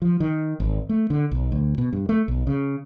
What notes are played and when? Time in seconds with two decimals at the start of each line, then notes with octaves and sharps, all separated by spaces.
0.02 F3
0.20 D#3
0.60 G#1
0.89 A3
1.10 D3
1.31 B1
1.52 D2
1.78 B2
1.93 G2
2.09 A3
2.28 B1
2.47 C#3